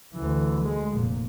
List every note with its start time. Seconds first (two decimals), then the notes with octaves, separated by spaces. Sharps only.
0.14 D2 E3
0.64 G#3
0.95 F1 A#2